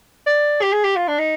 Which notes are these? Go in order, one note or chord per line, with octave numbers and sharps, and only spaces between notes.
D5
G4
G#4
G4
F4
D4
D#4